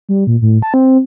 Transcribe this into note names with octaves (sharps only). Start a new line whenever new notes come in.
G3
A#2
A2
A5
C4